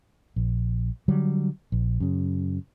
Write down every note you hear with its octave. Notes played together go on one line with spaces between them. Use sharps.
A#1
D3 F#3 G3
A#1
F#2 C#3